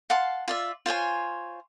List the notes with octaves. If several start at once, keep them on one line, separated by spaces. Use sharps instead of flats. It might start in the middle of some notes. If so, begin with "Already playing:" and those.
F5 F#5 A5 C6
F4 D5 E5
F4 C5 C#5 G#5